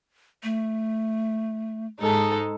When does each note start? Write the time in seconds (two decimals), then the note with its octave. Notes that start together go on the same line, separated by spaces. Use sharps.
0.43 A3
2.01 G#2 G#3 D#4 A4 A5